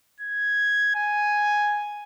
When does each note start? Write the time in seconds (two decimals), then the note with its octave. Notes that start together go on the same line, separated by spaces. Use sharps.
0.20 G#6
0.95 G#5